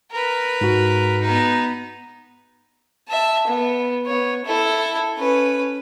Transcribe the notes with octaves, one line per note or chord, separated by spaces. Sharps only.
A#4 B4
G#2 F#4
B3 D#4
E5 A5
B3
B3 C#5
E4 A4
C#4 B4